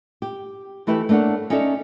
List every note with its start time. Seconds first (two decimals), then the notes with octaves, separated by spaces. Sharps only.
0.22 G4
0.87 E3 A3 E4 G4 B4
1.09 A3 A#3 D4 C#5 F#5
1.50 C#4 D#4 A4 D5 E5